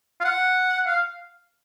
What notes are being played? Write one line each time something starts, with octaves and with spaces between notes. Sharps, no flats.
F5
F#5
F5